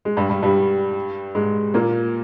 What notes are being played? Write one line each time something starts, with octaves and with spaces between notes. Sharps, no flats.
G#3
G2 G3
G2 G3
G2 G3
G#2 G#3
A#2 A#3